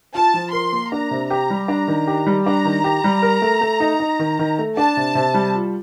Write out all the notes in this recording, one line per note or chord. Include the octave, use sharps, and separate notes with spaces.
F4 A5
F3
A#4 C6
A#3
D4 A#5
C3
G4 A#5
G3
D4 A#5
D#3
G4
G3
D4 A#5
D#3
G4
G3
A#4
A3
A3
D#4
D#4
D#3
D#3
A3
D4 A5
C3
C3
G3
F4